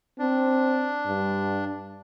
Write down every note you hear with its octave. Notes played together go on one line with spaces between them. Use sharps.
C4 D4
G2